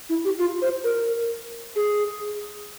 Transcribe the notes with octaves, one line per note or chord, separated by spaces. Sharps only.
E4
G4
F4
C5
A#4
G#4